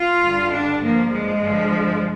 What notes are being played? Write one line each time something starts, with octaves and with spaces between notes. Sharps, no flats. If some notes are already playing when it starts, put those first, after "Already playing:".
Already playing: F4
G2 D3 G3
D4
G2 F3 A#3
G#3
G2 D3 F3